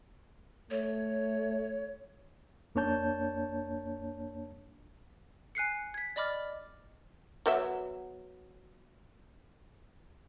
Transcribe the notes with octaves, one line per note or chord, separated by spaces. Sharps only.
A3 C#5
F2 A#3 D4 C#5 A5 G6
G#5 F#6 C7 C#7
G#6 B6
D5 D#5 B5 D6 F6 A6
F#3 B3 E5